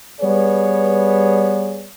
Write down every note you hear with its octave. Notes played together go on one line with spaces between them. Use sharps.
G3 B3 G#4 B4 C#5 D5